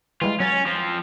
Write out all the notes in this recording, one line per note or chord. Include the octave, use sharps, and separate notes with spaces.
E3 G3 G#3 F4
F#3 C#4 G#6 A6
F3 C4